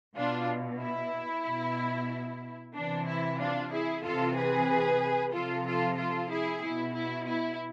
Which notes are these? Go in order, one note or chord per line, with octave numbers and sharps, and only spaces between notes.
B2 D4 F4
E4
B2
C3 E3 D4
E4
D4 F4
E4 G#4
C3 E3 F4 A4
G#4 B4
C3 F3 F4 A4
F4 A4
F4 A4
E4 G#4
B2 E4
E4
E4